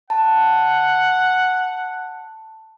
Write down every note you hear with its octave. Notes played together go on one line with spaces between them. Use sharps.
F#5 A5